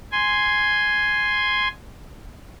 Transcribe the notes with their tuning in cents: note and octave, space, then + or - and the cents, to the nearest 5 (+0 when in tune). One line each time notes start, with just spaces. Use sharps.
G#5 +0 C6 +0